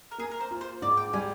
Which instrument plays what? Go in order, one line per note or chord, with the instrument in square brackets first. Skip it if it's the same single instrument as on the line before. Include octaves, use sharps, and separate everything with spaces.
[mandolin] A#4
[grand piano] A#3 [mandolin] G#4
[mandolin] A#4
C5
[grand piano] F4
[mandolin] C5
[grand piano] G#2 [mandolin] D5
[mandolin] G5
[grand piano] G3 [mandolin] G#5